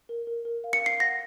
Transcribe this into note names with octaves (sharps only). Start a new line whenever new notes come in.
A#4
A#4
A#4
F5
C#7
F5
C7
F#5 A#6